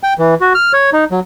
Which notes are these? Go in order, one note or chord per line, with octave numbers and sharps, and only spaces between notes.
G5
E3
F#4
F6
C#5
D#4
F#3